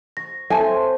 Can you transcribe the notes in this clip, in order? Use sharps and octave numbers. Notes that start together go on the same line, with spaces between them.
C#6 A#6
C4 A4 C5 C#5 E5 G#5 A5